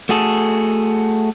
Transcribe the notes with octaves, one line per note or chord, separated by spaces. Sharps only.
A3 F#4 G#4 A4